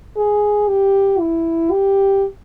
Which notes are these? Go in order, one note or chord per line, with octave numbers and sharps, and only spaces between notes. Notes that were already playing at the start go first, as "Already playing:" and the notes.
G#4
G4
E4
G4